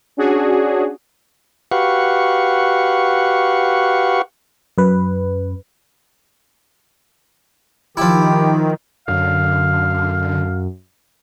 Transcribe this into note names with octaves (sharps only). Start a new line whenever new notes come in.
C#4 D4 F#4 G#4
F#4 G4 B4 F5 F#5 C#6
F#2 B4
D#3 F3 E4 G4
F#2 D3 F5